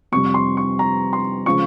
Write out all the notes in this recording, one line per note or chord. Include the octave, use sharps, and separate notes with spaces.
F2 C3 G3 C#6
C6
C#6
A#5
C6
C#3 F3 G#3 C#6